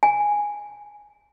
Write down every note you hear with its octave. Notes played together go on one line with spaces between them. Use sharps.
G#5